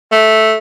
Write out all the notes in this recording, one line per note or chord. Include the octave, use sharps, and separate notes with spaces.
A3